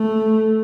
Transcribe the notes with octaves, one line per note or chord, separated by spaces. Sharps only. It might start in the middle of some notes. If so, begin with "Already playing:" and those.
Already playing: A3